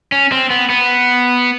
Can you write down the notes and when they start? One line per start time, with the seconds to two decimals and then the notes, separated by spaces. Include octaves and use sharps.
0.12 C#4
0.32 C4
0.50 B3
0.70 B3